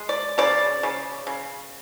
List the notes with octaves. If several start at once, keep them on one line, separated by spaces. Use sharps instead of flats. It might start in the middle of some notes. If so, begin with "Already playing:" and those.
Already playing: G#3
D5
C#3 D5
C#3
C#3